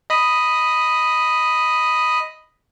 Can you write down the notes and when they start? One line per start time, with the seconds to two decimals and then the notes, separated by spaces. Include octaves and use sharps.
0.10 D#5 B5 D#6